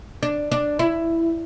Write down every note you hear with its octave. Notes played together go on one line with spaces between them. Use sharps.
D4
D4
E4